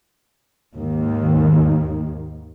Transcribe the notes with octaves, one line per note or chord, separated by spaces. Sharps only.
D#2 G#2 D#3 A#3